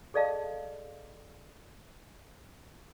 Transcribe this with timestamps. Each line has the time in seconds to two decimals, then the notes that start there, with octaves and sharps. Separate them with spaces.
0.14 G#4 A4 D5 D#5 F5 A5